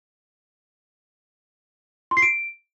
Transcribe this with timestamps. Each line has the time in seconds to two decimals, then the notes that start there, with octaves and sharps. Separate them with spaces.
2.11 C6
2.17 C7
2.22 D7